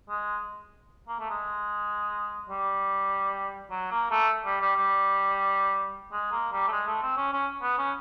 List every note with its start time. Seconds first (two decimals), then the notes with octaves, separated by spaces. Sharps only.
0.09 G#3
1.08 A#3
1.19 A3
1.30 G#3
2.50 G3
3.71 F#3
3.92 A#3
4.11 A3
4.46 G3
4.61 G3
4.76 G3
6.12 G#3
6.32 A#3
6.53 G3
6.68 A3
6.72 G#3
6.87 A3
7.02 C4
7.17 C#4
7.33 C#4
7.62 B3
7.78 C#4